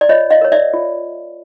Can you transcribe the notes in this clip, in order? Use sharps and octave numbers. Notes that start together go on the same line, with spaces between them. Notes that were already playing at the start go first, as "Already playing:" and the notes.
D5
F4 C#5 D#5
D#5 F5
A#4 C#5
D5 E5
F4